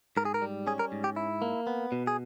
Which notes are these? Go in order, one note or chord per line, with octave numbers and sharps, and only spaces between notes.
G#2 A#4
G#4
A#4
G3
C#4 G#4
A#4
G#2
G4
E4
A#3
B3
B2
G#4